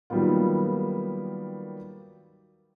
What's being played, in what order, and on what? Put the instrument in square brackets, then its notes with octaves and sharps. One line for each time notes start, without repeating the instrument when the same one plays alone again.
[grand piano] D#3 F#3 G3 A#3 B3 F4